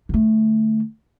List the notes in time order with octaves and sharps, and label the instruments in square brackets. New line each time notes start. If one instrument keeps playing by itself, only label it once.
[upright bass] D3 A3